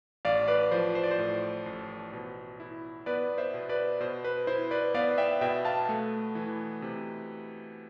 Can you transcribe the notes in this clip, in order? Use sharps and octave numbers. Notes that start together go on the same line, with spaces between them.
A1 D5 F5
B4 D5
F3 C5
C5
D5
C5
A2
A1
B2
E4
B3 B4 D5
C5 E5
B2
B4 D5
B2 C5
B4
E4 C5
B4 D5
B3 D5 F5
E5 G5
B2 E5 G5
F5 A5
A3
E3
C3